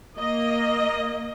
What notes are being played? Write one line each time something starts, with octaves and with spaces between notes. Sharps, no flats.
A#3 D#5